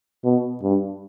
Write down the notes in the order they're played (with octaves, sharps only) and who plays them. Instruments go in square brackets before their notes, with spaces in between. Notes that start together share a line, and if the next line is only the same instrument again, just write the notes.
[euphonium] B2
G2